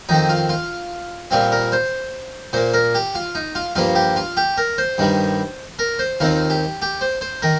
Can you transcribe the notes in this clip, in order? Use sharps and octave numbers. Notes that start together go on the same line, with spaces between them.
F2 D#3 C4 D#4
F4
F4
A#2 G3 C4 F4
A#4
C5
A#2 A#3 C5
A#4
G4
F4
D#4
F4
G2 F3 A#3 F4
G4
F4
G4
A#4
C5
G2 D#3 G3
A#4
C5
D#2 D#3 C4 F4
G4
G4
C5
C5
D#3 A#4